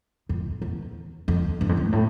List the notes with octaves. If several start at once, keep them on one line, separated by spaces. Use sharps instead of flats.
F2
E2
F2
G2
F2
E2
A2